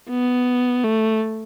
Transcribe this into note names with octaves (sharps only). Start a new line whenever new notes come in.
B3
A3